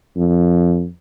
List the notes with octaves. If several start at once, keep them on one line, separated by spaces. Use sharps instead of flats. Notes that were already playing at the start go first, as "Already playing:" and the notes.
F2